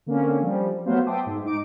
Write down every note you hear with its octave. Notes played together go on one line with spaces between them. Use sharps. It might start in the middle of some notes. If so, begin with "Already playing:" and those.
D3 A#3 C4 C#4
F3 G3
F#3 A3 B3 C5 F5
E5 G5 A5 C6 D6 D#6
G#2
G#3 D#4 D6 D7